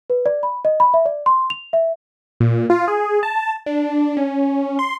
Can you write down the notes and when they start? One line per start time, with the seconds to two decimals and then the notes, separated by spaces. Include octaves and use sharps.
0.10 B4
0.26 D5
0.43 B5
0.65 D#5
0.80 B5
0.94 E5
1.06 D5
1.26 C6
1.50 F7
1.73 E5
2.40 A#2
2.70 F4
2.88 G#4
3.23 A5
3.66 D4
4.17 C#4
4.79 C6